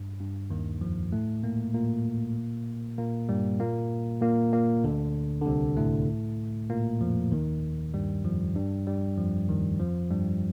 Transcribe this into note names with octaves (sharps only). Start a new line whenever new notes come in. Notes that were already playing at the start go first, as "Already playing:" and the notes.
Already playing: G2
G2
D#2 D#3
F2 F3
A2 A3
A#2 A#3
A#2 A#3
A#2 A#3
G2 G3
A#2 A#3
A#2 A#3
A#2 A#3
D2 D3
D3
C2 C3
A2 A3
A#2 A#3
F2 F3
D#2 D#3
G2 G3
F2 F3
G2 G3
G2 G3
F2 F3
D#2 D#3
F2 F3
G2 G3